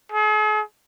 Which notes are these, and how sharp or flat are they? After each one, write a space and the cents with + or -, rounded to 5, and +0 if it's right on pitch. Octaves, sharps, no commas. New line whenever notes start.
G#4 +45